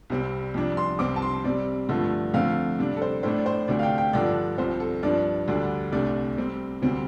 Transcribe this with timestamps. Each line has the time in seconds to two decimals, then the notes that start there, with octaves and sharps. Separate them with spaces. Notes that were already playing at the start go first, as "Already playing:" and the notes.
0.10 C2 C3 G3 C4
0.54 F2 C3 G3 D4
0.77 C6
0.99 C2 C3 G3 C4 D6
1.16 A5
1.22 C6
1.44 C3 G3 C4 D5
1.89 G2 D3 F3 A3
2.34 F2 D3 A3 C4 F5
2.79 C3 G3 D4
2.97 A4
3.02 C5
3.23 A2 A3 D4 C5
3.38 D5
3.46 C5
3.68 D2 C3 A3 D4 D5
3.79 F5
3.83 G5
3.98 G5
4.13 G2 D3 F3 D4 D5
4.58 C2 C3 F3 C5
4.80 A4
5.03 G2 F3 D4 D5
5.48 D2 D3 G3 D4
5.92 C2 C3 A3 D4 D5
6.37 C3 G3 C4
6.82 D2 C3 G3 C4